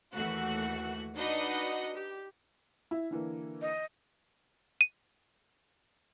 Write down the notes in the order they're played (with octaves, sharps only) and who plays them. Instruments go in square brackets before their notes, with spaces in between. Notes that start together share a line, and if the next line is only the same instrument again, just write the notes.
[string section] D#2 E3 A3 F#4 F#6
D4 D#4 F#4 B4 D#5 F#5
G4
[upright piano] E4
D3 E3 A#3
[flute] D#5
[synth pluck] D#7